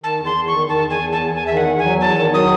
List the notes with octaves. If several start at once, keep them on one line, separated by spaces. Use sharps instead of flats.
D#3 A5
E2
C6
E2
D#3 C#6
D#3 A5
E2 G#5
E2
A5
E2
E2 G#5
E5
D#3
F#5
E2
G#5
F#3
E2 A5
D#3
F#3 D#6